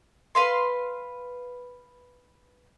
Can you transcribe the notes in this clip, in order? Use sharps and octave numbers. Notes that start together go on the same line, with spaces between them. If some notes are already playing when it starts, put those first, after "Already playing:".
B4 F5 C6